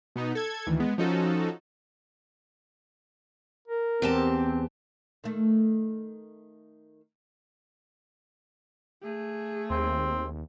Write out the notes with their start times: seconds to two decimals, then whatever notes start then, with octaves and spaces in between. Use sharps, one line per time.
0.16 B2 B3 D#4
0.35 A4 G#6
0.67 D2 D#3 E3
0.80 G#3 B3
0.98 F3 C#4 D#4 F#4 A4
3.68 A#4
4.02 E2 C4 G4 A5
5.24 D#3 A3
9.02 A3 G#4
9.70 D#2 C4